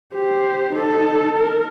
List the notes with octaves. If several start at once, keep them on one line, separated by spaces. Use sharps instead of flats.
G4 C5
D#4 A4
A#4